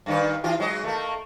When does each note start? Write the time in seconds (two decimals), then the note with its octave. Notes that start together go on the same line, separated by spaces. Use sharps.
0.06 G2 D#3 B4
0.44 E3 F4 G4
0.60 F#3 G#3 D#5
0.84 A3 A#3